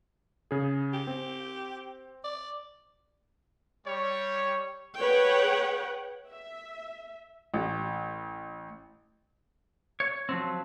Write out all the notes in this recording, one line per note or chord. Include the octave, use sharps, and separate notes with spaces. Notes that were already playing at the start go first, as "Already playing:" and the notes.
C#3 G#4
G4
C4
D5
G3 C#5
G#4 B4 C#5 F#5 G5
E5
A1
C#5
F3 F#3 C4